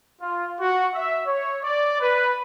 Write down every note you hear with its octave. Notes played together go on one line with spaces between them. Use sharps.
F4
F#4
E5
C#5
D5
B4